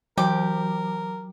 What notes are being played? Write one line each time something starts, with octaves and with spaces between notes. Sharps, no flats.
E3 F#3 G4 A#4